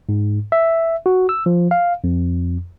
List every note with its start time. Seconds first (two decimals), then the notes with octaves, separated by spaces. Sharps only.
0.09 G#2
0.52 E5
1.06 F#4
1.29 E6
1.46 F3
1.71 F5
2.04 F2